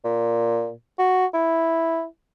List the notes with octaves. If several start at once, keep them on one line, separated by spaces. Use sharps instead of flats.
A#2
F#4
E4